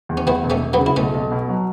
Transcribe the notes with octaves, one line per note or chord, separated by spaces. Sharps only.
E2
C#4
E2 B3 E4
E1
A3 C#4
E1
F#3 B3
C#3
E4
B1 A3 C#4
B1
B2
F#3